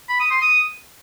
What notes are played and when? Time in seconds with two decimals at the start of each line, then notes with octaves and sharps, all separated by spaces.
0.09 B5
0.20 D#6
0.31 C6
0.42 D#6